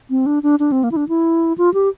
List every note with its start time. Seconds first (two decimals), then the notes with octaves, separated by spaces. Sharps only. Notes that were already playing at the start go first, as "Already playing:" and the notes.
0.10 C4
0.26 D4
0.43 D4
0.59 D4
0.72 C4
0.84 A#3
0.92 E4
0.96 D4
1.09 E4
1.58 F4
1.74 G4